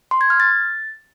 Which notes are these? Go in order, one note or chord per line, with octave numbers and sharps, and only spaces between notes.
C6
G#6
F6
A6